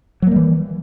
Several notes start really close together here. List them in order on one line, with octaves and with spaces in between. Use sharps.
F#3 A#3 G3 E3